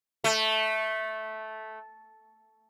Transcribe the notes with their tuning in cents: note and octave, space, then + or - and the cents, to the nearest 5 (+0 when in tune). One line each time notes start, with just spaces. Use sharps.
A3 -10